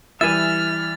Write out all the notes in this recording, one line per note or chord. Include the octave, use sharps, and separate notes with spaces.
E3 G3 E4 E5 G#5 F6 A6